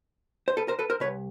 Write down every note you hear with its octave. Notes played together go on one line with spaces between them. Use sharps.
C5
A4 B4
A#4 C5
A4 B4
A#4 C5
C2 B2 B4 C#5